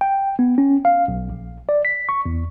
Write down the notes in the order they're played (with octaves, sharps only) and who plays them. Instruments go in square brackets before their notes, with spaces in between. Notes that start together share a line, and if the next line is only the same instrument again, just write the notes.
[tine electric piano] G5
B3
C#4
F5
B1
A#1
D5
B6
C#6
E2